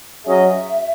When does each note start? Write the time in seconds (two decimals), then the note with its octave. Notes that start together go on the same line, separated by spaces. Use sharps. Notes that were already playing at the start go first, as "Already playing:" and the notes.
0.24 F#3 C#4 G#4 D#5 E5